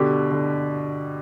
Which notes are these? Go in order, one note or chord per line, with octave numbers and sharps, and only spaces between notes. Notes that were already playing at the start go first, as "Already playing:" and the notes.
Already playing: B2 D3 G4
D3